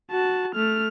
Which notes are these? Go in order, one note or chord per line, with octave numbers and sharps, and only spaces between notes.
F#4 A5
A3 F6